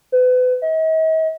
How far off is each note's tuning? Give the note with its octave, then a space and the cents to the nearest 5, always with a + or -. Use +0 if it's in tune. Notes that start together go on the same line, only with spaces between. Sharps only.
B4 +35
D#5 +45